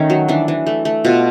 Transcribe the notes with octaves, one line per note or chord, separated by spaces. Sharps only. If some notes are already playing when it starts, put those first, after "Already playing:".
Already playing: D#3 A3 C#4
F#3
E3 D4
E3
A3
A3
B2 F4